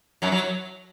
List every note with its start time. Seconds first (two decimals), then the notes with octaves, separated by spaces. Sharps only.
0.22 F#2 F#3
0.32 F#3